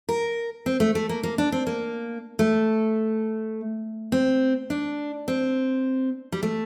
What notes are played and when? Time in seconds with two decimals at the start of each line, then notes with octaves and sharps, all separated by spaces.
0.09 A#4
0.66 C4
0.80 A3
0.95 A3
1.09 A#3
1.23 A#3
1.38 D4
1.52 C4
1.67 A#3
2.39 A3
4.12 C4
4.70 D4
5.28 C4
6.32 G3
6.43 A3